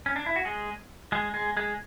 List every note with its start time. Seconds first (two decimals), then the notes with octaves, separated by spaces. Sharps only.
0.06 C#4
0.16 D4
0.26 E4
0.36 F#4
0.45 G#3 G#4
1.12 G#3 G#4
1.34 G#3 G#4
1.57 G#3 G#4